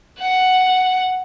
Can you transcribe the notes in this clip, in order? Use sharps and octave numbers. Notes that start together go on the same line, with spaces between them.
F#5